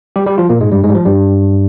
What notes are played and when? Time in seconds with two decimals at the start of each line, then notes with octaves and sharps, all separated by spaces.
0.16 G3 G4
0.26 G3 G4
0.38 F3 F4
0.49 A#2 A#3
0.60 G#2 G#3
0.72 G2 G3
0.84 G#2 G#3
0.90 G3
0.95 F3
1.05 G2 G3